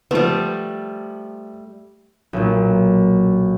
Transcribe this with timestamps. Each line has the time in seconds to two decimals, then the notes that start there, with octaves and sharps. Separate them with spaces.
0.11 F3 G3 A3 B3
2.33 B1 A#2